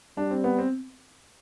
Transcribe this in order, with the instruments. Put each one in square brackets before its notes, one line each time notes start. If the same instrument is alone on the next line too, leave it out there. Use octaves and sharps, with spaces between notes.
[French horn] G3 [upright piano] D4
[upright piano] C4
B3
C4